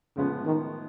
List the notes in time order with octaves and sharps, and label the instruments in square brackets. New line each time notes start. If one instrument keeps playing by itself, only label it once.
[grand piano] A2 F3 G#3 B3 [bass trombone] C#3
[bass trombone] D#3